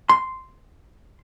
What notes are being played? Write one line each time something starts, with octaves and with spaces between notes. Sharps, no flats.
C6